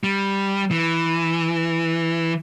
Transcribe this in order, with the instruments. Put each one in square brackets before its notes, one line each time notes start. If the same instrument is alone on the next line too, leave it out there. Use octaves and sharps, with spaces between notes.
[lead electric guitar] G3
E3